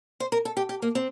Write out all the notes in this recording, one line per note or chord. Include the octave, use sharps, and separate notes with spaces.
C5
A#4
A4
G4
G4
A#3
C4